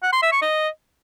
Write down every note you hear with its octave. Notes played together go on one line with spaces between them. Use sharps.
F#5
C6
E5
C#6
D#5